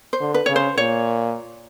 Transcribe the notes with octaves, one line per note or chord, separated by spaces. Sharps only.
C5
D3
B4
C#3 C#5
C5
A#2 C#5